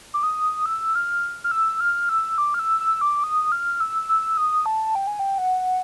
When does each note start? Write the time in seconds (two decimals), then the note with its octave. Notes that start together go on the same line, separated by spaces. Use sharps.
0.14 D6
0.23 D#6
0.66 E6
0.95 F6
1.44 F6
1.51 E6
1.80 F6
2.09 E6
2.38 D6
2.54 F6
2.59 E6
2.81 E6
3.01 D6
3.24 D#6
3.52 F6
3.80 E6
4.09 E6
4.37 D#6
4.66 A5
4.95 G5
5.07 G#5
5.19 G5
5.38 F#5